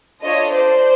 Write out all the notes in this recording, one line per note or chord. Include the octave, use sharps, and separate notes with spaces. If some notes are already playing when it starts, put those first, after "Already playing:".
D4 F4 A4 C#5 D#5
C5 D5